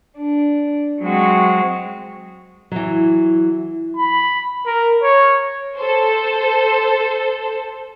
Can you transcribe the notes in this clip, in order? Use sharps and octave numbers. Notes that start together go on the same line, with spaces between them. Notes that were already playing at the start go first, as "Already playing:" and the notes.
D4
F#3 G#3 C4 F#4
E3 F#3
B5
A#4
C#5
A4 C5